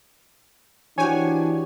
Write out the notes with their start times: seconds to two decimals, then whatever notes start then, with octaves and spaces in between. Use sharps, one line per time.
0.98 E3 D4 F#4 G4 C#5 G#5